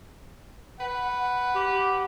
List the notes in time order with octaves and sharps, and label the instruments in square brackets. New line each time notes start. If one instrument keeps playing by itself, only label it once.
[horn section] B4 F#5
[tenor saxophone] G4